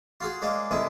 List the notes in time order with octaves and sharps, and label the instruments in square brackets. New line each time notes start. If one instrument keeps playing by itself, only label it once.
[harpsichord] F4 F#4 G#4
G#3 A#3 C#4 D4
C2 D3 G#3 E4